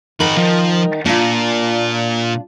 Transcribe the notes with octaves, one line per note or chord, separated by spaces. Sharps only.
G#2 D#3 D#4 A#4 B5
F3
A#2 D4 F4